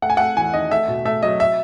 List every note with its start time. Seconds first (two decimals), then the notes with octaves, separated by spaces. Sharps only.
0.02 A3 F#5
0.10 G#5
0.17 A3 F#5
0.37 E2 G#5
0.54 D#3 D#5
0.71 A3 E5
0.88 B2
1.05 A3 E5
1.23 F#3 D#5
1.40 E5